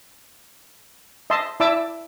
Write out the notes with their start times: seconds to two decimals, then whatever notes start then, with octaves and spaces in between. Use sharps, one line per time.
1.30 D#5 E5 A5 C6
1.60 E4 D5 E5 A5 D6 E6